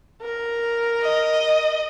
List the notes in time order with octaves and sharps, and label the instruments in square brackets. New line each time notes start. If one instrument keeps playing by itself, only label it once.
[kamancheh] A#4
[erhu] D#5